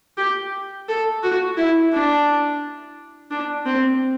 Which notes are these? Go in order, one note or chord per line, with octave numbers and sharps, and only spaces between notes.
G4
A4
F#4
E4
D4
D4
C4